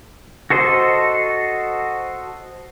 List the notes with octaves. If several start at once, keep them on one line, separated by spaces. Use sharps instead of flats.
F#4 A4 C5 D#5